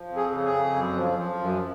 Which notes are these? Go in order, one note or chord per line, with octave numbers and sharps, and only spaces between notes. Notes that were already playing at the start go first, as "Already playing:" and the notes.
Already playing: F3
F2
G#4
C#3
G#4
F2
F#2
F3
F3
F#2